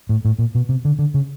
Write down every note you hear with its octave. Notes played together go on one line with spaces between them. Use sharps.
A2
A2
A#2
B2
C3
D3
D3
C#3